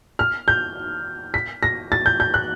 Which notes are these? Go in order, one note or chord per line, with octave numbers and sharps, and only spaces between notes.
F6
G6
B6
A#6
A6
G6
G6
F#6